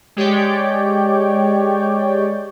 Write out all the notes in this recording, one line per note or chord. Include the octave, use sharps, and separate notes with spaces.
G#3 G4 C#5 D5 G5